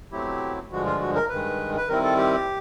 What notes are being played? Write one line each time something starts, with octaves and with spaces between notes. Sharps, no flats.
B2 F#3 A3 C4 E4 G4
G2 D3 F3 G#3 F#4
F4
F#4
A#4
G2 D#3 G#3 B4
B4
D#3 G3 C4 E4 A#4
A4
G4